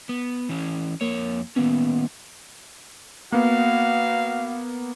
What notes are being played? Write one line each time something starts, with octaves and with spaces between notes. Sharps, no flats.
B3
E3 C#4
F2 A#3 C#5
D#3 A#3 B3 C#4
A#3 B3 F#4 F5